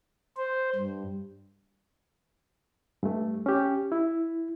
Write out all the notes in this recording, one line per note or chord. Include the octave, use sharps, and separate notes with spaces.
C5
G2
G2 A3
C#4 G4
E4